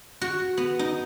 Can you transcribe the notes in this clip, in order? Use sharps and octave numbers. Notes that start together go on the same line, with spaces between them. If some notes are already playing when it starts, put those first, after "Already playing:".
F#4
B3
D#4